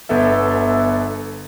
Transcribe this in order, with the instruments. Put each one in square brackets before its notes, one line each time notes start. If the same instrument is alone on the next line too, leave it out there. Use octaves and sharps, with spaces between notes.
[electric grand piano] G1 B3 A4 E5